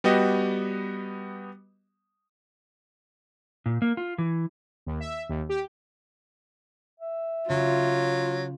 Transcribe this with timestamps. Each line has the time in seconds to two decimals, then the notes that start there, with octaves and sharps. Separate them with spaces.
0.04 G3 B3 F#4 G4 D#5
3.66 A#2
3.82 A#3
3.97 F4
4.18 E3
4.86 D#2
5.00 E5
5.29 D#2
5.49 G4
7.00 E5
7.50 C#3 F#3 F4